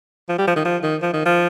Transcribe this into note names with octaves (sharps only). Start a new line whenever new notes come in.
F3
G3
F3
D#3
F3
D#3
F3
D#3
F3